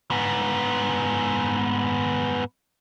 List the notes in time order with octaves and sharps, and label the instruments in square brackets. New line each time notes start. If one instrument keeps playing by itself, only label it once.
[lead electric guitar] G#2 B3